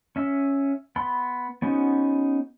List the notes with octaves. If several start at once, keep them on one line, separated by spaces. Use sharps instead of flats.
C#4 E5
B3 B5 C6
B3 C#4 D#4 F#4 C5